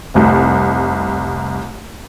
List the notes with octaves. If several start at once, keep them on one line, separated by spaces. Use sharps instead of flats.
F1 C2